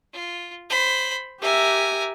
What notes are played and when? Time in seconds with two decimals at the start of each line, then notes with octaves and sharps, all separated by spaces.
0.13 F4
0.69 C5 B5
1.41 G4 A#4 E5 G#5